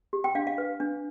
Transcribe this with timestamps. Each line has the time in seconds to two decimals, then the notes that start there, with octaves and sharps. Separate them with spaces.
0.13 G4
0.24 G5
0.35 D4 F5
0.47 F5
0.58 B4
0.80 D4